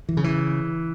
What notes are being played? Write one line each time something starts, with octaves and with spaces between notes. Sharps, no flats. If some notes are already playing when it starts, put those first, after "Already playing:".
E3
C#3
E3